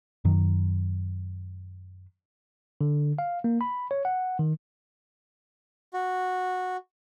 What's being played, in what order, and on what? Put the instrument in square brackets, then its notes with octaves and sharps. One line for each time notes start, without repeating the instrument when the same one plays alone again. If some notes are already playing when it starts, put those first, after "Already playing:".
[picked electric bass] F#2 D#3 F#3
[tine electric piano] D3
F5
A#3
B5
C#5
F#5
D#3
[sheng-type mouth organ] F#4